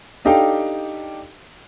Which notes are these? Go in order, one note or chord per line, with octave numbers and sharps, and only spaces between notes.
D4 D#4 G4 A4 F5 G5